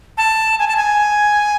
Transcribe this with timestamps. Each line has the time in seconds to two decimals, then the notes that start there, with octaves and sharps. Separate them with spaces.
0.18 A5
0.59 G#5
0.68 A5
0.76 G#5